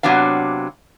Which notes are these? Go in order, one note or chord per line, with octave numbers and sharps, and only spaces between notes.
C3 F#3 B3 D4 F5